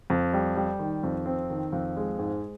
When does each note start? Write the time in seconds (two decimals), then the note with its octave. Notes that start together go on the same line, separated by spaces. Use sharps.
0.10 F2
0.33 G3
0.56 G3
0.79 D#3
1.03 F2
1.26 C4
1.50 D#3
1.72 F2
1.97 G#3
2.19 G#2